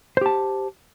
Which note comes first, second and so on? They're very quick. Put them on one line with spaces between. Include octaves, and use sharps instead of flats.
C5 G4 A5